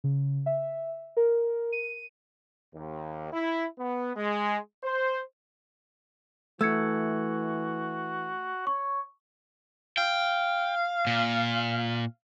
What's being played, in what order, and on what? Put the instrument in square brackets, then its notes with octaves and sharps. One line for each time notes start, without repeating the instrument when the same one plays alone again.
[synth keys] C#3
E5
A#4
D#7
[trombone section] D#2
E4
B3
G#3
C5
[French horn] E3 [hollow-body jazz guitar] A3 [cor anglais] F#4 [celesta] E6 G#6 C#7
[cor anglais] C#5 [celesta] C#6
[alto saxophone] F5 [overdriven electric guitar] G5
[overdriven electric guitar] A#2